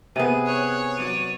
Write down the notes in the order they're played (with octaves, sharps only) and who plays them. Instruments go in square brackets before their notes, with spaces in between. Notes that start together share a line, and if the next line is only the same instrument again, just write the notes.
[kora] C3 B3 [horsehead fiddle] G#4 [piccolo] D#7
[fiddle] C#5 [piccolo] F#6
[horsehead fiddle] F#3 D5 [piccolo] D#7